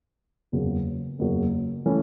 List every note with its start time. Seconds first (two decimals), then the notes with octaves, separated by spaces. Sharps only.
0.52 F#1 E2 C#3 F#3
1.19 F#1 E2 C#3 F#3
1.86 E3 A3 C#4